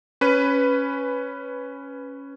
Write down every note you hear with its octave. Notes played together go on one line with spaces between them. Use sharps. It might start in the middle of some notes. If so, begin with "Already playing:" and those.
C#4 B4 D#7